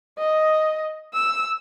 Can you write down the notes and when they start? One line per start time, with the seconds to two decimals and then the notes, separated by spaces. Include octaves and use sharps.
0.19 D#5
1.14 E6